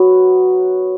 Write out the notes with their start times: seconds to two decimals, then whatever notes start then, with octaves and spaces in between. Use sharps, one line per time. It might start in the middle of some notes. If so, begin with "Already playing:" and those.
Already playing: F#3 B3 F#4